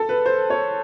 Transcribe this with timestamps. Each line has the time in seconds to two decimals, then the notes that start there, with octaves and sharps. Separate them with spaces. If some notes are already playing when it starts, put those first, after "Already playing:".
Already playing: A4
0.09 B4
0.26 C5
0.50 C#5